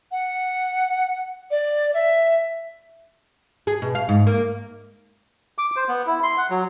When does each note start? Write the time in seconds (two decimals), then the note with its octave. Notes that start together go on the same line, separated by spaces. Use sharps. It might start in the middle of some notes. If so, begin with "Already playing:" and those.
0.12 F#5
1.51 D5
1.94 E5
3.67 G#4
3.82 B2
3.95 F5
4.09 G#2
4.27 A#3
5.58 D6
5.76 C5
5.88 B3
6.07 E4
6.23 C6
6.38 F#5
6.50 F#3